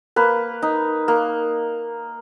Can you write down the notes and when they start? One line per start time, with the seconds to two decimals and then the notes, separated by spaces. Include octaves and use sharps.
0.16 A#3 B4
0.62 D#4
1.08 A#3